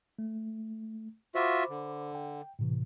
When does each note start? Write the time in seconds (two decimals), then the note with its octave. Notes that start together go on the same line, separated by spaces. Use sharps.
0.19 A3
1.35 F4 F#4 C5 E5 B5 D6
1.69 D3
2.15 G5
2.59 A2 C3 E3